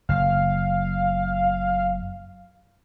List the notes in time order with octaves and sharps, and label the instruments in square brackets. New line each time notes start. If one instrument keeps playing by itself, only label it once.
[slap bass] F#1 [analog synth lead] F5